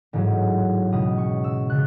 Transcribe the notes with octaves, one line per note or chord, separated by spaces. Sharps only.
A1 G#2 F#3
C#2 B2 G#3 D#6
C#6
E6
C#3 F#6